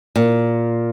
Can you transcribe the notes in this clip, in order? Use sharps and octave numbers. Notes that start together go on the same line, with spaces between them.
A#2